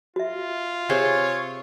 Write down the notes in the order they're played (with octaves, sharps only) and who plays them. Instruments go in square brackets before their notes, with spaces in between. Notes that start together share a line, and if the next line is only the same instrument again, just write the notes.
[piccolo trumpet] F4 [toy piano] F#4 E5
[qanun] C3 G#4 C5 [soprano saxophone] C#5